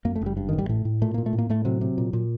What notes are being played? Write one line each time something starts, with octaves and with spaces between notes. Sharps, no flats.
F#2 A#3
A3
F#1 G3
G2
A1 D#3
G3
A2 A3
A2
A#2 A3
A#2 A#3
A3
A2
A#3
A2 A3
C3 F#3
C3
A#2
A#2